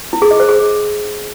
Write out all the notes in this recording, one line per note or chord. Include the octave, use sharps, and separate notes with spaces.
E4
G#4
D#5
C5
G#4